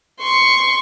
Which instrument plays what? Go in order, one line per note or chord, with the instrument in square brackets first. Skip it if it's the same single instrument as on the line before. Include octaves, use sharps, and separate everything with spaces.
[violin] C6 C#6